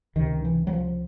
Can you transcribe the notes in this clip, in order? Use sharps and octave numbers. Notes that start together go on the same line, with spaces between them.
C#2 C3 D#3
E3
F#3
F3